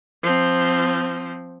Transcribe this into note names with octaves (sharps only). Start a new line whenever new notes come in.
F3 C4